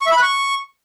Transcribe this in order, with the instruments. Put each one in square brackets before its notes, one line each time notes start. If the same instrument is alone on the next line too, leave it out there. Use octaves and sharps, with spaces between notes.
[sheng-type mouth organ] C#6
E5
B5
F#6
C#6